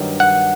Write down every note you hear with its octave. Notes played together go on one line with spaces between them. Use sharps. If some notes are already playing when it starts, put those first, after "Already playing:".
Already playing: G2 D#3 F#3
F#5